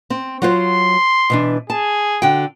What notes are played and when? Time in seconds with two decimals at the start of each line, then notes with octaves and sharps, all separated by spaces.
0.10 C4
0.42 F#3 F4 C5 C6
1.30 B2 E3 D4
1.70 G#4 A5
2.22 D3 F#4 G5